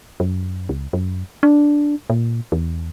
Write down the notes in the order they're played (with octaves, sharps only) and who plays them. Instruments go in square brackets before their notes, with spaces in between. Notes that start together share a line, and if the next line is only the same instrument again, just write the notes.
[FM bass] F#2
C#2
F#2
D4
A#2
E2